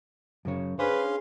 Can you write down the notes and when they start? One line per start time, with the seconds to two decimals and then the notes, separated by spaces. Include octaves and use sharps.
0.45 F#2 C#3 C#5
0.79 C#4 D4 G#4 B4 C5 F5 C6